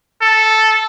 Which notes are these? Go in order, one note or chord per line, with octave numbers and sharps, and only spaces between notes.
A4